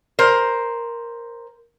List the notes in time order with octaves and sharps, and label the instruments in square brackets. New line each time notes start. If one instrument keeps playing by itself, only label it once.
[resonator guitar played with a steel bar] A#4 C5